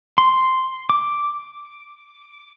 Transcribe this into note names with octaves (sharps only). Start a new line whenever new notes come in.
C6
D6